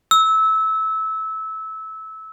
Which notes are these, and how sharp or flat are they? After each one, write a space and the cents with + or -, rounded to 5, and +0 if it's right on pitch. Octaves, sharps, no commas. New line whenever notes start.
E6 -20